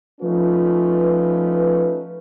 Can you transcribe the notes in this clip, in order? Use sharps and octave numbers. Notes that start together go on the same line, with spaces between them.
F3 A3 C#4 D#4 F4 B4